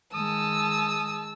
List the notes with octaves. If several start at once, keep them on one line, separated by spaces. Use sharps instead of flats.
D#3 G#3 A5 D#6 E6